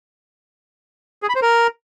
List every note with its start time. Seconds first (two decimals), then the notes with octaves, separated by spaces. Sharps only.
1.23 G#4
1.29 B5
1.36 C5
1.42 A#4